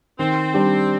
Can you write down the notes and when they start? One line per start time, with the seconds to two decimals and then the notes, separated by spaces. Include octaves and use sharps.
0.19 D#3 C4
0.54 G3 D4 G4